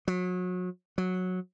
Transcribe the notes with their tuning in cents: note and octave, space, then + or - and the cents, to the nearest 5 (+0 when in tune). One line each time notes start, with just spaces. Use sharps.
F#3 -30
F#3 -10